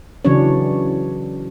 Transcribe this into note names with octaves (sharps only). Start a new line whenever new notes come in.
C#3 E3 F#3 C#4 D4 C#5